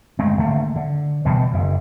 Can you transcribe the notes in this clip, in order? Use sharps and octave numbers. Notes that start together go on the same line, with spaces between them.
G1 G#3 A3 C4
G#1 D3 A3 A#3
D3
B2 D#3 E3 G3
F#1 F#2